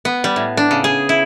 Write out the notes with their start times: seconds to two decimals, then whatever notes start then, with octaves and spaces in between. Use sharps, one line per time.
0.05 B3
0.24 G3
0.36 A2
0.57 D4
0.71 C#3
0.84 G#4
1.09 E4